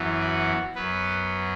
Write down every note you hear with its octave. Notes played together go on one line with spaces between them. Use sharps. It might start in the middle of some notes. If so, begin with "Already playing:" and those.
Already playing: F#2 E3 B3
F#4
F#2 F#3 B3 B4